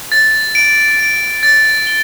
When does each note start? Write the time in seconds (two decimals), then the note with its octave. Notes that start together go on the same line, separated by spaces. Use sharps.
0.12 A6
0.55 D7
1.00 D7
1.43 A6
1.87 G7